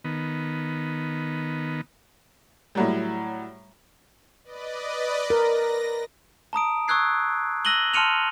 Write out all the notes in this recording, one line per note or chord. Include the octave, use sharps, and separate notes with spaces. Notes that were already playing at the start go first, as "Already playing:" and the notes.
D#3 B3
A2 F#3 G3
B4 D5 D#5
A#4 A#6
A5 A#5 D#6 D7
C#6 D#6 E6 F#6 G#6 C7
E6 F#6 A#6 D#7 F#7 G7
A5 C6 F6 C#7 D#7 F7